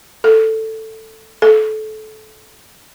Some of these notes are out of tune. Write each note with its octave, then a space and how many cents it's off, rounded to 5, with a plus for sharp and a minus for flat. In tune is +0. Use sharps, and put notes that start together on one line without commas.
A4 +10
A4 -25